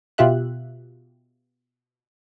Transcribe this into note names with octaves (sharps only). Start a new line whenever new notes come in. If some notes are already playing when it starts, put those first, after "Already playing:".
B2 F4 G4 E5 F#6